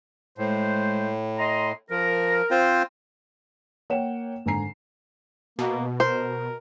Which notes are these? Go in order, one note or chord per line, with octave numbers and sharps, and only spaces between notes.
A2 G#3 C5
D#5 A#5 C6
F3 A#4
C4 F4 C5
A#3 C#5 F#5 G5 E7
G#1 D3 G#5 A#5 C7
B2 A#3
A#4 C5